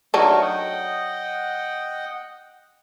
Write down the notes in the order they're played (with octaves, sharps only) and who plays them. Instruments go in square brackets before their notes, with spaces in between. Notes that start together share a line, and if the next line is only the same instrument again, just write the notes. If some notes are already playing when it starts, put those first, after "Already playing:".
[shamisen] F#3 D4 D#4 [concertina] A3 A#4 C#6
[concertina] D#5 F#5 G5